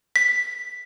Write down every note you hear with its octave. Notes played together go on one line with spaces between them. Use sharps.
B6